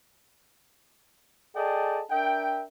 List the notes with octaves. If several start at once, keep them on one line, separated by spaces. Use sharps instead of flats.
G#4 A4 D5 D#5 G5 A5
D4 A#4 E5 G5